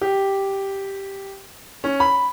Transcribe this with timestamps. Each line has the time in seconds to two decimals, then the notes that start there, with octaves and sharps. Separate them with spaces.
0.01 G4
1.84 C#4
2.00 B5